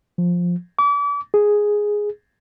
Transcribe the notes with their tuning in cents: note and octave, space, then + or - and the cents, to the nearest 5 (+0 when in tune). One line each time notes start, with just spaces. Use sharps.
F3 +10
D6 -35
G#4 +0